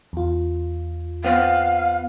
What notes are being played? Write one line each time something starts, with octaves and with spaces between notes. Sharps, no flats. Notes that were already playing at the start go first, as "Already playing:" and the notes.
E2 F4
B3 C4 F5